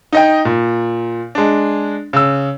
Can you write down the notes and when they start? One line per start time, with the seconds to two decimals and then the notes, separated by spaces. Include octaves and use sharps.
0.12 D#4 D#5 G5
0.45 A#2
1.35 G#3 D4
2.13 C#3 E6